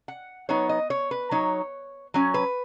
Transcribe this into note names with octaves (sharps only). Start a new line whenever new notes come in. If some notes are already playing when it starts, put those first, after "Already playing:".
F#5
F#3 B3 D#4 C#5
D#5
C#5
B4
F#3 D#4 C#5
F#3 C#4
B4